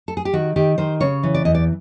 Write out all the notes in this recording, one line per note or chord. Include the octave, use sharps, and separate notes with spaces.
A4
G#4
G4
D#3 F#4
D#3 G4
D#3 C5
C#3 C#5
E3
D5
E2 D#5
D5